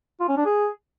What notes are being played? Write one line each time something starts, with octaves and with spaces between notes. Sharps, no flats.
F4
C#4
D4
G#4